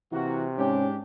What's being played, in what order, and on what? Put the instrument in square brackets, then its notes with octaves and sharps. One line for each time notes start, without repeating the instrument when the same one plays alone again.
[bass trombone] C3 [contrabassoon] E3 [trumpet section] A#3 F#4
[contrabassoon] G#2 [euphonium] C#4 [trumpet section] D4 G4